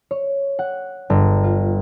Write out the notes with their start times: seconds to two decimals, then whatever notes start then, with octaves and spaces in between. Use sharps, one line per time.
0.11 C#5
0.59 F#5
1.10 G1
1.44 F4